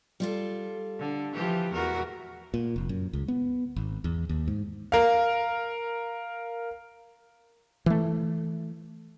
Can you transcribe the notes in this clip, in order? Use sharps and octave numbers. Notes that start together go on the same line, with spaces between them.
G3 F4 A4
D3
E3 F3 G4
E2 F#4 A#4
A#2
F1
F#2
C#2
B3
G#1
E2
D#2
G#2
A#4 F5
E3 A3